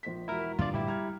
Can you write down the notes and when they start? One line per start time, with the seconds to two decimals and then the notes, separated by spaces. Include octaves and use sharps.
0.03 A#1 C5 B6
0.28 E1 E4 F#4 A#4
0.59 E2 G2 D3 D4 F4 D5
0.74 A2 D3 E4 G4
0.87 G3 A#5 F6 G#6